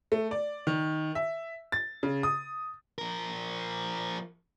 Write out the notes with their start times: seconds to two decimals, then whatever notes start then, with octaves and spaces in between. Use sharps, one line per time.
0.12 A3
0.31 D5
0.67 D#3
1.15 E5
1.72 A6
2.03 C#3
2.23 D#6
2.98 F3 A#4